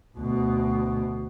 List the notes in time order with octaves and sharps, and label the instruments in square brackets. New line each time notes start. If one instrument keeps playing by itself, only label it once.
[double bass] D2 B2